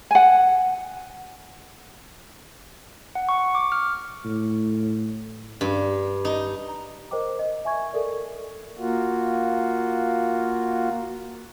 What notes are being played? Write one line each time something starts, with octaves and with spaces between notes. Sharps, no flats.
F#5 G#5
F#5
C#6
D6
F6
A2
G2
D#4
A#5
A#4 C5 D#5 G5 D6
D#5
E5 G#5 C#6 G#6
A4 A#4 D5
A#3 F4 F#4